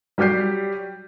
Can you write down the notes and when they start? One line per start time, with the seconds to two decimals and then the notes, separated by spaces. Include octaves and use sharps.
0.18 F#3 G3 G4 G6 C7